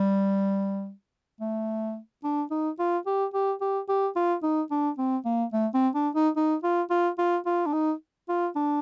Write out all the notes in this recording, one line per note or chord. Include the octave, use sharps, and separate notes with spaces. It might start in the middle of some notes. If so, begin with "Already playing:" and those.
Already playing: G3
A3
D4
D#4
F4
G4
G4
G4
G4
F4
D#4
D4
C4
A#3
A3
C4
D4
D#4
D#4
F4
F4
F4
F4
D4
D#4
F4
D4